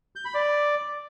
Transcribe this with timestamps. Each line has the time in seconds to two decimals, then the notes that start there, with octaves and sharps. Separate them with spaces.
0.16 G6
0.25 B5
0.34 D5